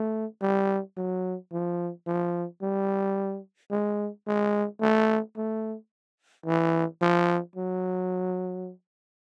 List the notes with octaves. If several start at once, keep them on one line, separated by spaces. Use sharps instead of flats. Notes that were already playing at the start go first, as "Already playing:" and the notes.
Already playing: A3
G3
F#3
F3
F3
G3
G#3
G#3
A3
A3
E3
F3
F#3